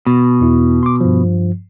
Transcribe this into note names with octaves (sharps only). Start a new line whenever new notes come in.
B2
E2 E4
C6 D6
G2 F3